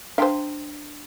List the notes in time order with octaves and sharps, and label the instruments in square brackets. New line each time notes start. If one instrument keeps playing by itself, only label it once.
[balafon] D4 G5 C6 [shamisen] C5 F5